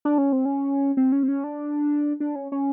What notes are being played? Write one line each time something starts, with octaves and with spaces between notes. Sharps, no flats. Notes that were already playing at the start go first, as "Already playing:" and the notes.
D4
C#4
C4
C#4
C4
C#4
C4
C#4
D4
D4
C#4
C#4